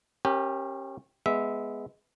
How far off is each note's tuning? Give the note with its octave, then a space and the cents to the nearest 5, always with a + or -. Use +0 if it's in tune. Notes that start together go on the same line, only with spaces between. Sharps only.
C#4 -35 G4 +0 A#4 +0
G#3 +0 B3 +5 E5 -15